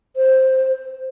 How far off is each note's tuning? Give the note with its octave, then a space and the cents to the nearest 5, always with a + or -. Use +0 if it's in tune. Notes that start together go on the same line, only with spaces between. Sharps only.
C5 +5